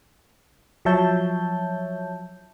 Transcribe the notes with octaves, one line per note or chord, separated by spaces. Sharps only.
F3 F#3 C#5 E5 A5 G6